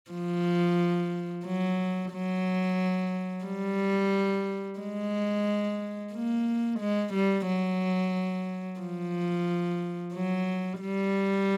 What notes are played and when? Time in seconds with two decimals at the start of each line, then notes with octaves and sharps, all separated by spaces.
0.11 F3
1.46 F#3
2.12 F#3
3.45 G3
4.79 G#3
6.13 A#3
6.79 G#3
7.14 G3
7.47 F#3
8.80 F3
10.14 F#3
10.81 G3